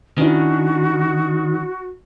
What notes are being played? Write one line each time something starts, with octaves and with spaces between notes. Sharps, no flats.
D#3 C#4 D4 E4 F#4